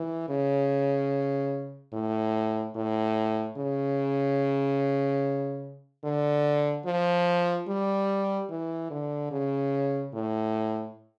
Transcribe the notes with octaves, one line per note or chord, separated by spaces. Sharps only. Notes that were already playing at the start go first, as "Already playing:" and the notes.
Already playing: E3
C#3
A2
A2
C#3
D3
F3
G3
E3
D3
C#3
A2